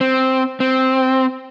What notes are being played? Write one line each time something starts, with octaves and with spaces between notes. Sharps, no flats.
C4
C4